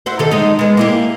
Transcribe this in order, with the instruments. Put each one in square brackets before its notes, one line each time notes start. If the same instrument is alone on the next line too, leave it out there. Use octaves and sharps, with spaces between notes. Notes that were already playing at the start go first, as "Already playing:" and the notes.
[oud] E4 F#4 C5
D#3 G4 A4
G#3 D#4
G#3 B3
A#3 E4 G4